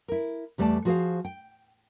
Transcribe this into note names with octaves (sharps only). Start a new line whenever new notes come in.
E4 A#4
E2 G3 A3 C5 D5 A5
F3 F#4 G#4 A#4 C5 F5
G5